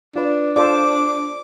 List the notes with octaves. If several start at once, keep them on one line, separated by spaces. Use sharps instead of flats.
D4 F4 B4 D5
F4 A4 C5 D5 D6